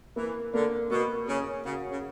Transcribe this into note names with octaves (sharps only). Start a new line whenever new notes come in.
E3 A#3
D3 A#3
B2 A#3
C#3 A#3
C#3 F#4
C#3